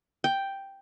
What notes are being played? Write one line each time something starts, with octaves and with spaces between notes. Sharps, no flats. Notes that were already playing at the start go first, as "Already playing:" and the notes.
G5